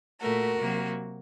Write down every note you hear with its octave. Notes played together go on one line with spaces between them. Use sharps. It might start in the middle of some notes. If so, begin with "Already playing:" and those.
A#2 A3 F#4 A#4
C3 F#3 A#3